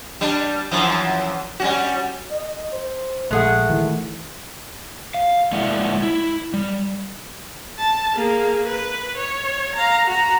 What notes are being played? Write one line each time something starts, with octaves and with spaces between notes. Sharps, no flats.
G3 D4
F#2 E3 F3
G3 C#4 F#4
D#5
C5
A#1 G#3 A3 G#4 F#5
D#3 E3
F5
G#3 A#3 E4 D5 E5 F#5
E4
G3
A5
A#3 G#4
B4
C#5
F5 A#5
F#4 A#5